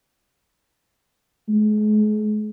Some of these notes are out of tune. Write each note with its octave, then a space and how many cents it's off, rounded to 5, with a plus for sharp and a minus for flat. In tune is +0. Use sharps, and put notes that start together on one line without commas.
G#3 +35